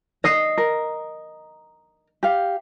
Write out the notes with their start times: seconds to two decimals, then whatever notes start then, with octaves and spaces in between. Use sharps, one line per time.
0.24 D#5 D#6 C7
0.58 A#4
2.23 G4 F5